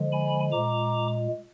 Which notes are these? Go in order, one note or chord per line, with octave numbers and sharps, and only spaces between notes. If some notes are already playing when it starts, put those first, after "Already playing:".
Already playing: D3 F3 G#3
G#5 B5
A#2 G#3 A#5 D6